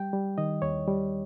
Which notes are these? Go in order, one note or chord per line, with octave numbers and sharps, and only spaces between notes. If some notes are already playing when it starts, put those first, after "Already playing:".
Already playing: G3 G5
G3
D#3 D#5
D#2 C#5
G3